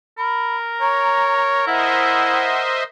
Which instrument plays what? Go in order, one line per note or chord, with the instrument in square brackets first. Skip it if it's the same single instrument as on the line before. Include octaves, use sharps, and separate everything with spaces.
[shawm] A#4 [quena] B5
[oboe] C#5 [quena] A#5
[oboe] E4 [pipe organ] C5 D#5 E5 [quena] F#5